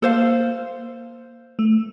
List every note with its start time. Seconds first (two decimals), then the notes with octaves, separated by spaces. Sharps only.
0.02 A#3 A4 C5 F5
1.59 A3